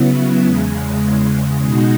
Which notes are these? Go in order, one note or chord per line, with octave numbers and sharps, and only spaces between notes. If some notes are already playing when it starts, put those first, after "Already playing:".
Already playing: C#3 F#3 B3 E4
E2 C#3 G#3
B2 G#3 D#4 F#4